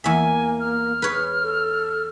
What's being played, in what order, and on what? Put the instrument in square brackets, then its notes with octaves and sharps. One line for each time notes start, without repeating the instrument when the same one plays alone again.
[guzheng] E2 E5 [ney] A#3 [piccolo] G#5
[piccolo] F6
[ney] G#4 [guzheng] B4 C#5
[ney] A4